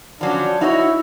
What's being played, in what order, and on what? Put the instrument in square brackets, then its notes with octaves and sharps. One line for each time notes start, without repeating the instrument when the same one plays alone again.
[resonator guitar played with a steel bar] F3 F#3 C#4 [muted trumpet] D4
[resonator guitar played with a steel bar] D#4 F#4 C#5 [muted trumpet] E4